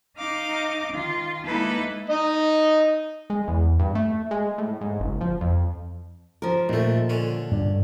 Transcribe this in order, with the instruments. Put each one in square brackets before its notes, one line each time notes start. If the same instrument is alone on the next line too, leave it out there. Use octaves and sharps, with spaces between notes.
[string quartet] D#4 D#5 F5 D6
D#3 F4
G#3 A#3 D#4 E4 A4 B4
[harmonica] D#4 D#5
[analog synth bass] G#3
E2
G2
A3
G#3
A2
G#2
F#1
F3
F2
[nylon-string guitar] F3 A#4
[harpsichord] D#2 A3 [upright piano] A#2
[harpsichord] D3 C#4
[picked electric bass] G2 D4